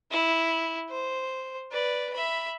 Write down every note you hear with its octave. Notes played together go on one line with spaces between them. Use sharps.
E4
C5
B4 D5
E5 B5